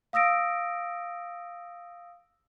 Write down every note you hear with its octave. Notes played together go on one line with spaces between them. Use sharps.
F5 D#6 E6 A#6 D7